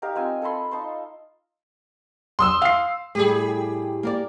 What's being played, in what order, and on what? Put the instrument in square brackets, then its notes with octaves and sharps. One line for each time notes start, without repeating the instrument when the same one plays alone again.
[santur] D#4 G4 A#4 F5
C4 F4 G#5
A4 A5 B5 C6
D#4 A5 C6
[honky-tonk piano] C6 D#6 E6
[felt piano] F5 C7
[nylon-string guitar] A2 G3 [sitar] G4 G#4
[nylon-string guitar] A#3 A#4 D5